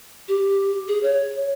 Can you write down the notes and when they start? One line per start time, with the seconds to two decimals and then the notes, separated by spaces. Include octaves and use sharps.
0.28 G4
0.88 G#4
1.03 C#5